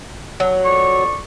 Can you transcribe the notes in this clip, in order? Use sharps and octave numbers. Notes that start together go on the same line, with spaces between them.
F#3
F2 D5 C#6